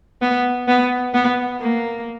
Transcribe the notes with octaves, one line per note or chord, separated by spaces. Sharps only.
B3
B3
B3
A#3